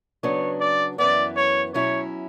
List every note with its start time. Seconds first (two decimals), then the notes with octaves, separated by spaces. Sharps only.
0.23 C#3 F#3 B3 D4 C#5
0.60 D5
0.98 F#2 E3 B3 D5
1.36 C#5
1.74 B2 F#3 C#4 E4 C#5